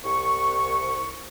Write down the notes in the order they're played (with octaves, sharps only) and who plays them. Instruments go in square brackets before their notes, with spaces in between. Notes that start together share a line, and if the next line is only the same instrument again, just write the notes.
[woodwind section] C2 C#6